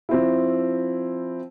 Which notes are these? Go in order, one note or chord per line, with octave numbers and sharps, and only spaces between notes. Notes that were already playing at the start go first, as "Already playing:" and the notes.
F3 C4 E4